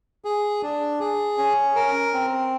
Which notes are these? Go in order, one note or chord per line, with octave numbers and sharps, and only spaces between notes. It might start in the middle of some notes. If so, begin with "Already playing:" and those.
G#4
D4
G#4
C#4
A#4
C4